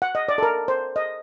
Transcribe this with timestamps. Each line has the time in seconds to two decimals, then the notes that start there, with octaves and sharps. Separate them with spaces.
0.02 F#5
0.15 D#5
0.29 D5
0.38 A4
0.43 A#4
0.68 C5
0.96 D#5